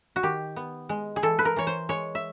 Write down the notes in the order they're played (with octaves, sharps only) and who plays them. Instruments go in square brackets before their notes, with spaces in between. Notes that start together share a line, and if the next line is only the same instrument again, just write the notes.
[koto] F#4
D#3 G4
B3
G#3
G#4
E3 A4
B4
A#4
E3 C#5
C5
G#3 C#5
E5